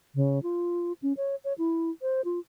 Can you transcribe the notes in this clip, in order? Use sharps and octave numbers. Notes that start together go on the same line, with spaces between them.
C#3
F4
C#4
C#5
C#5
E4
C5
F4